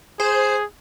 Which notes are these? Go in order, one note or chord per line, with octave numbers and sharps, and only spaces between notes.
G#4 C5